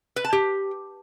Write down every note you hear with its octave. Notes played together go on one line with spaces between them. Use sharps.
B4
A5
G4